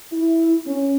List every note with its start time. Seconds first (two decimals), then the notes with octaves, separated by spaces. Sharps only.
0.12 E4
0.66 C#4